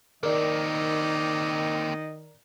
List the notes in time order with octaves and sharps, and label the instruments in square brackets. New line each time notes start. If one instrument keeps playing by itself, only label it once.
[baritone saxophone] D#3 [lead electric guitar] A#3 C4 [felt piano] A#4 D5 [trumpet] D#5